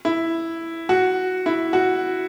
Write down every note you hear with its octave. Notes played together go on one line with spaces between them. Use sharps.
E4
F#4
E4
F#4